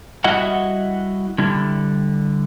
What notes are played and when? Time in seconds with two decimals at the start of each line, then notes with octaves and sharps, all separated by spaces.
0.24 G3 E4 F#4 D#5 E5 F#5
1.38 D3 G3 E4